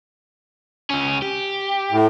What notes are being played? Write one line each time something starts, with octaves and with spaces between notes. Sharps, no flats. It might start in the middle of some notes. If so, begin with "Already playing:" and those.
C#2 C#4
G4
A2